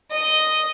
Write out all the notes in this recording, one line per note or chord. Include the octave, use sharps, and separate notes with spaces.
D#5